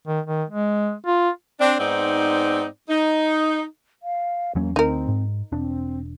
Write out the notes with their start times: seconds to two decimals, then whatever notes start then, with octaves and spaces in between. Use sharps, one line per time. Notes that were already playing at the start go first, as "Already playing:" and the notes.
0.07 D#3
0.26 D#3
0.50 G#3
1.06 F4
1.60 C4 D4
1.79 G#2 B3 C4 D#4 D5
2.89 D#4
4.03 F5
4.55 E2 F#3 A#3 C#4
4.76 D2 C4 D#4 A#4
5.08 G#2
5.52 E1 C4 D4